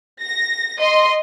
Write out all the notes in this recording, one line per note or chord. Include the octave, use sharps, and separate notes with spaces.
A#6
D#5 C6